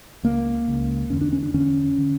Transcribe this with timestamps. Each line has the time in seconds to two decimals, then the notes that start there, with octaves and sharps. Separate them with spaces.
0.23 C#2 C#3 A#3
0.68 C#2 C#3
1.10 E2 D3 C#4
1.21 D4
1.33 C#4
1.43 D4
1.54 E2 D3 C#4
1.98 D3